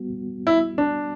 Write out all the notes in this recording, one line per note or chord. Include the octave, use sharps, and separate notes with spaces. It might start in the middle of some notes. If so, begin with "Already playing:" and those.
Already playing: G3 B3 F#4
E4
D4